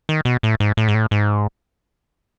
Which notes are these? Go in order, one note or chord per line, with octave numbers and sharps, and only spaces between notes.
D#3
B2
A2
G#2
A2
G#2
A2
G#2